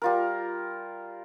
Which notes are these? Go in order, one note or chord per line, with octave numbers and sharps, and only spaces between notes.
G3 F4 A#4